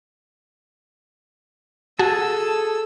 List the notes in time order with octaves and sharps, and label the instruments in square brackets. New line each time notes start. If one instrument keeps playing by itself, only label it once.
[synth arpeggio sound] F#4 [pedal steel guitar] G#4 A5 [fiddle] A4 E6